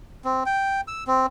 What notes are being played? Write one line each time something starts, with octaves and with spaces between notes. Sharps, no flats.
C4
G5
E6
C4